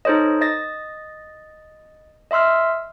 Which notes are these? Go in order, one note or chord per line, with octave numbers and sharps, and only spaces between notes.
D#4 A4 C5 C#5 D#5
D#5 A6 A#6
D#5 E5 C6 E6 F6